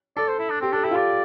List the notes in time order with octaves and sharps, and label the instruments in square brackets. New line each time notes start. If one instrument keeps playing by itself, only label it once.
[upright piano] A4 [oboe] D5
[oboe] C5
E4
D4
[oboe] C4 [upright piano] G4
[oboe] D4 [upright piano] A4
[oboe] E4 [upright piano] G4
[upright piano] F4
[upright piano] G4 [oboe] D5